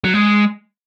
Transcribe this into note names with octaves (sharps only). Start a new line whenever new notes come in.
F#3
G#3